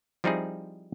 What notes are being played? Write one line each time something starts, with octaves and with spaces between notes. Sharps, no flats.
F3 G3 C4 D#4 E4 G#4